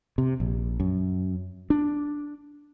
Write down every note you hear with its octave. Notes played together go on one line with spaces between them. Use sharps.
C3
A#1
F#2
D4